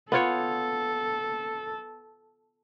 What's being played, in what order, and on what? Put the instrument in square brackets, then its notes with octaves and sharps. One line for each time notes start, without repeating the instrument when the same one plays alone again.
[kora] B3 F4 C#5 [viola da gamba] A4